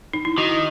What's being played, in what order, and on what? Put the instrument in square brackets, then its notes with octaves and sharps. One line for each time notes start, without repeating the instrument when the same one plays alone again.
[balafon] D#4
E4
[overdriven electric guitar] D#3 [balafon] F#4